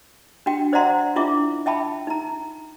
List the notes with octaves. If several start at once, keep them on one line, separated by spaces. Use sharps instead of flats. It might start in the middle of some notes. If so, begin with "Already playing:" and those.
D4 F#4 G5
C5 D5 E5 F#5 A#5 C6
C#4 D4 E4 F4 E5 D6
E5 G5 A5 B5
D#4 A#5